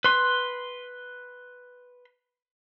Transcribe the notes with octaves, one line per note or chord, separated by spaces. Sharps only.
B4 C6